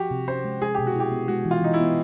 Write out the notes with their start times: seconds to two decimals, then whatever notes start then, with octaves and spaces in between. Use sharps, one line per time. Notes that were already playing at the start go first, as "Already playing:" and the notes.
Already playing: F3 F#4 G4
0.11 C3
0.28 C#4 C5
0.44 G#3
0.61 G#3 G#4
0.75 B2 G4
0.87 F#4
0.95 E4 G4
1.12 B3
1.28 G#3 F#4
1.45 E3
1.51 F4
1.62 E3 D#4
1.74 E4
1.80 B3